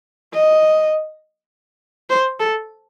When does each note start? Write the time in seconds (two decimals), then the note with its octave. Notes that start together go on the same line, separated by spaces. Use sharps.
0.34 D#5
2.10 C5
2.39 A4